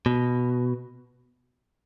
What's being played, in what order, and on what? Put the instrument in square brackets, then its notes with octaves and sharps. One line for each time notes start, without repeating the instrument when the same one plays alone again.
[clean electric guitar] B2